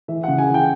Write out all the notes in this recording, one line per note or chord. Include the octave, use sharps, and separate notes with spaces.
E3 E5
C#3 F#5
G#5
E3
G5